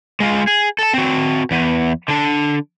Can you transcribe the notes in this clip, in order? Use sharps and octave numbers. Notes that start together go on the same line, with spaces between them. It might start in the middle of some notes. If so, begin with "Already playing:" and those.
G#3 F4
G#4
A4 A5
C4 F#4
E2 B3
D3 D4